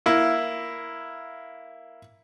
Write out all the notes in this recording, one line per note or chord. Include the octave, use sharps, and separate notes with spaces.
A#3 E4